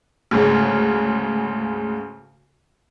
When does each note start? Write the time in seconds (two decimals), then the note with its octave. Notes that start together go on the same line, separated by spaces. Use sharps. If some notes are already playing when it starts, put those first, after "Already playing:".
0.31 D2 G#2 C#3